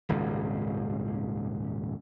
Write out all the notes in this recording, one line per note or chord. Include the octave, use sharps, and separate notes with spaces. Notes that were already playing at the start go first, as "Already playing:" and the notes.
D#1 G#1 C#2